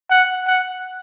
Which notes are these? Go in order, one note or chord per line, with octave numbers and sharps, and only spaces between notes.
F#5
F#5